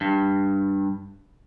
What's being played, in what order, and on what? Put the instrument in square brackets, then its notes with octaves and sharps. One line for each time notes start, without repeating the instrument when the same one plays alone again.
[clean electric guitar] G2